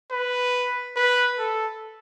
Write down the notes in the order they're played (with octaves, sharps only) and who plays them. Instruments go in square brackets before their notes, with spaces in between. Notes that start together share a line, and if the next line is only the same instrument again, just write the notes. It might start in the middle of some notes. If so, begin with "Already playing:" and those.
[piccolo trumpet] B4
B4
A4